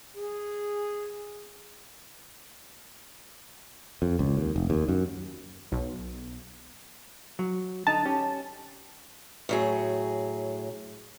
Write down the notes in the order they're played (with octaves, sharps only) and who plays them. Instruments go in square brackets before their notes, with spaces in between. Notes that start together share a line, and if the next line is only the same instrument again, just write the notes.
[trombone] G#4
[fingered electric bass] F2
C#2
D#2
F1
D#2
F#2
[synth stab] B1
[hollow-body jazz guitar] F#3
[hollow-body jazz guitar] D3 D#4 [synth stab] A5
[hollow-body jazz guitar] C#4 G4
[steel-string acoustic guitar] A2 F#3 G#4